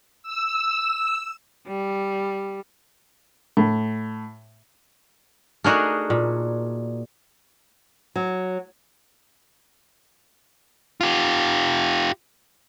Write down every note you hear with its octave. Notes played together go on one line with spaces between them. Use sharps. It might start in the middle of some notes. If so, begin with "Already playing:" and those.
E6
G3
A2
A3 D4 D#4 F#4 G#4 A#4
A#2
F#3
F4 G4